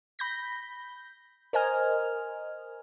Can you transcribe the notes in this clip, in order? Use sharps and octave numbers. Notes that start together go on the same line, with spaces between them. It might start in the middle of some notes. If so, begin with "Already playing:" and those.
B5 G6 A#6
A#4 C5 D#5 G#5 F6